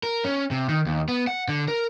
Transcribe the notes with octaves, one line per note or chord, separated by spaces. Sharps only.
A#4
C#4
C3
D#3
D#2
B3
F#5
D3
A#4